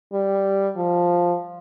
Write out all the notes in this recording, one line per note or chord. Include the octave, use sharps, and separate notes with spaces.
G3
F3